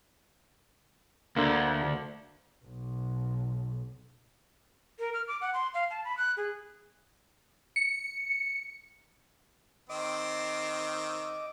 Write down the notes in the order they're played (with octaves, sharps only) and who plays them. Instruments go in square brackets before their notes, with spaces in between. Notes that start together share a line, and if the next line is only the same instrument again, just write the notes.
[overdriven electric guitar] D2 [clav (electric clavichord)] D3 A#3
[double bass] B1
[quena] A#4
F6
D6
F#5
C6
F5
A5
B5
F#6
G#4
[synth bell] C#7
[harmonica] D#3 C4 E6 [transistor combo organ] D#5 D6